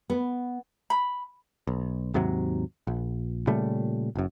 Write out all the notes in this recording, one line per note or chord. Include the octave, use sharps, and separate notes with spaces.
B3
B5
B1
D#2 G#2 C3 F#3
A#1
A#2 C#3 G3 A3
F#1 F#2